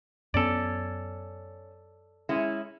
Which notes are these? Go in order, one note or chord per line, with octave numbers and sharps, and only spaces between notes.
F#2 B3 C#4 A4 D5
G#3 C#4 E4